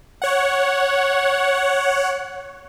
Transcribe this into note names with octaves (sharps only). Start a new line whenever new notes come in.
C#5 F#5